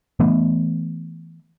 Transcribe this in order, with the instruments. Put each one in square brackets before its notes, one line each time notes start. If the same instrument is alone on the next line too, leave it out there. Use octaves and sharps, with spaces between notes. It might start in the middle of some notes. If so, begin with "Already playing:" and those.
[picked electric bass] E3 A3 B3